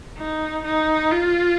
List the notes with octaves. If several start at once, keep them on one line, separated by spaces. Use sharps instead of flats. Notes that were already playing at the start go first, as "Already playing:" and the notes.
D#4
D#4
F4